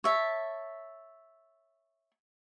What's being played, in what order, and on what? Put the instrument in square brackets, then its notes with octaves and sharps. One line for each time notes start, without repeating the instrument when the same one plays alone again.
[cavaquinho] C#5 E5 A5